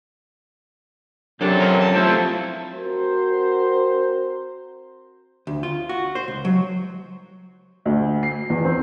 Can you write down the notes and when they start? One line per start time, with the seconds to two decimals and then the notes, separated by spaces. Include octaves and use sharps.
1.41 F#2 C3 F#3 D4 A4
1.60 F3 F#3 A#4
1.81 A5
1.95 F3 A3 C4 E4 A4
2.73 C4 F#4 A#4 C5
5.47 D2
5.63 F4
5.89 F#4
6.15 C5
6.28 C#2
6.45 F#3
7.85 D2
8.23 C7
8.50 E2
8.64 C4